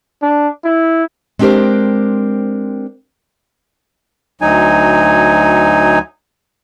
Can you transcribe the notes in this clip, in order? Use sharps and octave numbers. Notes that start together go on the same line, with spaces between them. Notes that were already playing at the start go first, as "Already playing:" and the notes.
D4
E4
G#3 C4 D4 G4 A#4 C5
D2 F#3 D#4 G#5